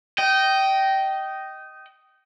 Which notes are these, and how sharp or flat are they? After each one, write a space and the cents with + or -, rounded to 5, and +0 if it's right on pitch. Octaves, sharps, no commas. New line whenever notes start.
D#5 +0 G5 -20